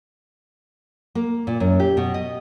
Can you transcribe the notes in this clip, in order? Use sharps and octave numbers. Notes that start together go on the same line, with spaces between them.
A#3
A#2
F#2
G4
B2
D#5